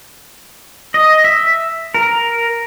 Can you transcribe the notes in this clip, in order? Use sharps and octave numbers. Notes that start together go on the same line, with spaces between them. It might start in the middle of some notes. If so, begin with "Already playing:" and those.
D#5
E5
A#4